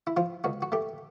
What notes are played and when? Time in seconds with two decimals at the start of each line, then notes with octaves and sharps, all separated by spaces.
0.07 E4
0.17 F3 F4
0.44 C#2 F#4
0.62 F#4
0.72 A3 G4